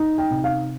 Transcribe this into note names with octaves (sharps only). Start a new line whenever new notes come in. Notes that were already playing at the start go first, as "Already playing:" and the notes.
Already playing: D#4
G5
C3
F5